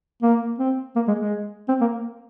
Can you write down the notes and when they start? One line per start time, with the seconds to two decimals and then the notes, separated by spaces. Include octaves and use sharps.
0.22 A#3
0.59 C4
0.96 A#3
1.08 G#3
1.20 G#3
1.68 C4
1.81 A#3